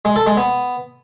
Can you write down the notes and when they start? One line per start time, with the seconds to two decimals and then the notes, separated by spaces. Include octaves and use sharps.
0.05 G#3
0.16 A4
0.26 G#3
0.37 B3